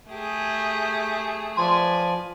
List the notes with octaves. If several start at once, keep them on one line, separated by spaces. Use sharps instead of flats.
A3 G4 G#4
F3 B4 D5 G#5 C6